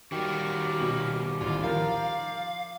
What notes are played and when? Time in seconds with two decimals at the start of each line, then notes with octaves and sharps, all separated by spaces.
0.12 D#3 G3 F#4 G4 F5 D6
0.79 B2 F#7
1.41 A1 D2 F4 D5
1.63 F3 A#4 F5